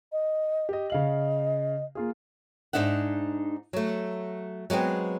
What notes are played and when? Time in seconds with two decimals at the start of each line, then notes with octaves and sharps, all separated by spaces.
0.12 D#5
0.69 G4 D#5
0.90 C#3 D#5 F5 F#7
1.95 A#3 F4 G#4
2.73 G#2 F3 D4 D#4 E5 F#5
3.73 F#3 A3
4.70 F#3 G#3 B3 C4